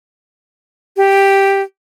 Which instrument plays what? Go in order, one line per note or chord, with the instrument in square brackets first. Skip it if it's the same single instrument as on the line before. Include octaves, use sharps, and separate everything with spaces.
[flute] G4